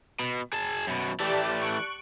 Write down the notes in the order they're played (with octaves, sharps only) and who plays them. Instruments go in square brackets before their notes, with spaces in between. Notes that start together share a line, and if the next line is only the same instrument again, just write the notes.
[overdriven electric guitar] B2
G#4 A5
F#2 B2
[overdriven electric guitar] E3 A3 [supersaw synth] G4 D5 A5
[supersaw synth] C#6 F#6 D7